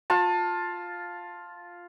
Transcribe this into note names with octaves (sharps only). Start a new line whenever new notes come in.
F4 A5